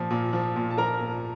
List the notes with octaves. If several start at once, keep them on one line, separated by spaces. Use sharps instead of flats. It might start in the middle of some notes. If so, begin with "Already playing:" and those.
Already playing: A#2 F3
A#2
F3
A#2
A5
F3 A#4 A#5
A#2